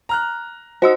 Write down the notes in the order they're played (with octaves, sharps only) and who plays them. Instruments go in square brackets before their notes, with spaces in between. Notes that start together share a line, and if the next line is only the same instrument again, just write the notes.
[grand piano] A#5 F6 F#6
[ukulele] D#4 F#4 [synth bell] C5 D#5 E6